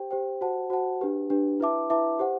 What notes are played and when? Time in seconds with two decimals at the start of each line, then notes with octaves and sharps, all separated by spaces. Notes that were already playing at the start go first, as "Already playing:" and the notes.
Already playing: G4 C5 G5
0.11 G4 C5 G5
0.41 F#4 C5 F#5 A5
0.70 F#4 C5 F#5 A5
1.01 D4 G4 B4
1.30 D4 G4 B4
1.60 E4 B4 E5 A5 D6
1.90 E4 B4 E5 A5 D6
2.19 G4 C5 F#5